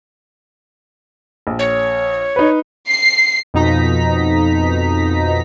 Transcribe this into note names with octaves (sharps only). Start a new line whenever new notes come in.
A#1
C#5
D#4 B4
C7
F2 B2 D#4 A#5 B6